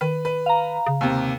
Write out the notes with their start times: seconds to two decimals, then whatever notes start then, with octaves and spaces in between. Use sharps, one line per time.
0.01 D#3 B4
0.25 B4
0.46 F5 A#5
0.86 C#3
1.01 D#2 C3